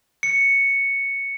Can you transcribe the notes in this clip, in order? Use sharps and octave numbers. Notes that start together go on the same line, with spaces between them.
C#7